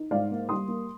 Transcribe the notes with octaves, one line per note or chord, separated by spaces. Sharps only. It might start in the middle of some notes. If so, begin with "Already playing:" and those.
Already playing: D#4
G#2 D5 F5
A#3
G3 C6 D#6
A#3